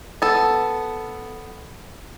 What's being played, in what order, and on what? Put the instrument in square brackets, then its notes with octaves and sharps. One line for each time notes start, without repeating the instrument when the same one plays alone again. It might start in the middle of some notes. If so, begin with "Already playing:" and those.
[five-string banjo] B3 A4